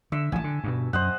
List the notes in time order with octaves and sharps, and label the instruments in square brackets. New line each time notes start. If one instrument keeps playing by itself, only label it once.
[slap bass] D3 [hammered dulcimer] E5
[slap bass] A1 D#3 F3 [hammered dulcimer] G#5 A5
[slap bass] D3
G2 B2
[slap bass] F#2 [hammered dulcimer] C5 D#5 F#5